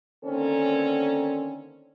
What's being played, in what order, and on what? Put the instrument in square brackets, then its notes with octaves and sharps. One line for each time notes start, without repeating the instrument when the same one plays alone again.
[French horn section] D3 D#3 A#3 C4 C#4 A4